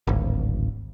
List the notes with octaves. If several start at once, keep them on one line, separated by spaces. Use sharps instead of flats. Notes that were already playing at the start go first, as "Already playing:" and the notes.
D1 G#1